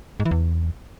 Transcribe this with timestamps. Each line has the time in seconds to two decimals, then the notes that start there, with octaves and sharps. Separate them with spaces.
0.20 G#2
0.25 E3
0.31 E2